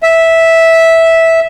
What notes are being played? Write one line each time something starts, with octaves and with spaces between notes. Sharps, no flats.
E5